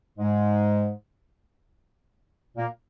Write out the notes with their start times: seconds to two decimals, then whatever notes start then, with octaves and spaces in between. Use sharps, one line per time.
0.19 G#2 G#3
2.56 A#2 A#3